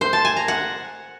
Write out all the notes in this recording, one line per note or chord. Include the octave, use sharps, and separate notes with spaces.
C5
A5
G#5
A#5
F#5